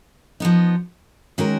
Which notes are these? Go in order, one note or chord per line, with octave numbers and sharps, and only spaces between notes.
F3 B3 D#4
D#3 G#3 C#4 F#4 A#4